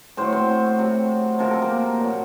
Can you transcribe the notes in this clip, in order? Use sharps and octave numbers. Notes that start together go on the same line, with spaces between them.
A2 F#3 C5
C4 C5
C3 F#3
C3 F3 A#4
A4
A#3 A#4
A#2 F#3